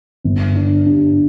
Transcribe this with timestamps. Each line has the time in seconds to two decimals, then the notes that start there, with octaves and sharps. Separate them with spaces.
0.24 G1
0.56 D4
0.86 G2